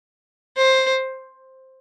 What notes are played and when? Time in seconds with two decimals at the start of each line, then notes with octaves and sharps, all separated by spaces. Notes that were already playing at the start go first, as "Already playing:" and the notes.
0.57 C5